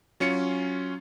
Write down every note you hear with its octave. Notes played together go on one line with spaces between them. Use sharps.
F#3 C#4 F4 C#7